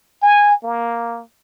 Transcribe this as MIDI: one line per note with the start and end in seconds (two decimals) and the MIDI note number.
0.22 0.55 80
0.63 1.22 58